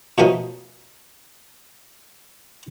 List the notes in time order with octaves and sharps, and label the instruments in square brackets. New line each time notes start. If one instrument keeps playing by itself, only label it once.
[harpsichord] B2 F3 A3 B3 C#4 D#4